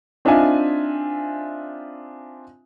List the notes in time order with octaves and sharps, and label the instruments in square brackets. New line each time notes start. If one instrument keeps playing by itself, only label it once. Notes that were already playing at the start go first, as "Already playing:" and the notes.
[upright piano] C4 D4 D#4 F4 E5 G#5